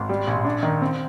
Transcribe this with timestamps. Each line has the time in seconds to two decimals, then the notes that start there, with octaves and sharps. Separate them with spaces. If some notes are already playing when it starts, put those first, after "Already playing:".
Already playing: G#1
0.09 G3
0.27 A#1
0.45 D4
0.63 D#3
0.82 C4